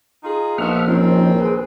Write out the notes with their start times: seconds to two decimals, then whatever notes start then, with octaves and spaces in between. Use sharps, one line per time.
0.23 D#4 F4 G#4
0.58 A#1 B2 F3 D#4 E5 F#5 F6
0.87 D#3 F3 C4 C#4 D#4
1.41 G#4 B4